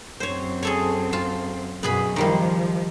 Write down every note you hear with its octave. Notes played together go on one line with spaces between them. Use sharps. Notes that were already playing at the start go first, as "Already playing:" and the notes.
F#2 C4 C5 C#5
G#4 A4 C#5
F4 F5 A5
F#2 B2 B3 G#4 B5
D#3 F3 G3 A#3